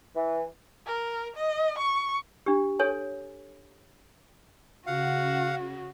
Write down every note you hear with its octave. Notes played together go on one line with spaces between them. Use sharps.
E3
A#4
D#5
C#6
D4 G4
A4 C#5 G#5
C#3 F#4 F5 F#5